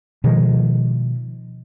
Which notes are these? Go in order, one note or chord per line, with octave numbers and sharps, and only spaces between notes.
B2 D#3 F3 G#3